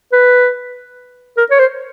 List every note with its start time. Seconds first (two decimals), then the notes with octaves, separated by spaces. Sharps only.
0.13 B4
1.38 A#4
1.51 C#5
1.59 C5